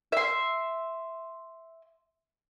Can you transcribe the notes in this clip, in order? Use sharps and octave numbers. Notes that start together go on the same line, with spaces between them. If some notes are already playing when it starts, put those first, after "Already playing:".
E5 C6